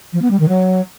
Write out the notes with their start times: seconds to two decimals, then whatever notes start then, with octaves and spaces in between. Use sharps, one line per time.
0.13 F3
0.22 B3
0.31 G3
0.40 D#3
0.49 F#3